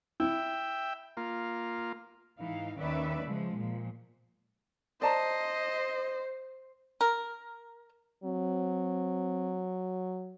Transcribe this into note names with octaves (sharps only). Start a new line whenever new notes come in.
E4 E5 G5
A#3 F4
G#2 E3 D#4 F5
D#2 D#3 C#4 B4 D5 E5
C#3 F3 G#3
A#2 F3
C5 D5 D#5 A5 A#5
A#4
F#3 C4